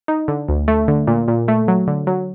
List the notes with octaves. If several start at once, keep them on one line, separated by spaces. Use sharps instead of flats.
D#4
D3
D2
A3
D3
A#2
A#2
A3
F#3
D3
F#3